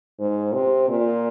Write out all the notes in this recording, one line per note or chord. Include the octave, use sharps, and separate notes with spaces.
G#2
C3
A#2